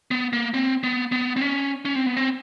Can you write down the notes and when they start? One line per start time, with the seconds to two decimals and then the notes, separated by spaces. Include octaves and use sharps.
0.11 B3
0.33 A#3
0.54 C4
0.83 B3
1.12 B3
1.36 C4
1.41 C#4
1.85 C#4
1.95 C4
2.06 B3
2.17 C4